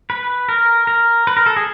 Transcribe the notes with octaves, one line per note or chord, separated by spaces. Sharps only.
B4
A#4
A#4
B4
A#4
A4
G#4